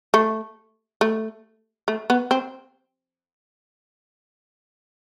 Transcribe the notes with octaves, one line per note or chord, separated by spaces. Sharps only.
A3
A3
A3
B3
C4